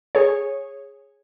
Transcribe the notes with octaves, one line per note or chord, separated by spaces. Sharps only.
G#4 C#5